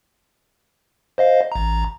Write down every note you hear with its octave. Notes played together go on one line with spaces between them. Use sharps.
C5 D#5 F5
A1 A#5